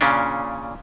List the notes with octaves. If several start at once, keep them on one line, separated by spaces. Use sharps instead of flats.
A#2 C#3 C#4 D4